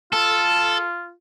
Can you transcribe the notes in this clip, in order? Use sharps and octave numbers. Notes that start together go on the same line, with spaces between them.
F4 A4